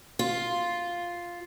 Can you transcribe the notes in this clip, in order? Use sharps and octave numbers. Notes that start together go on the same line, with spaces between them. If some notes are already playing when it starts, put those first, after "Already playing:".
F4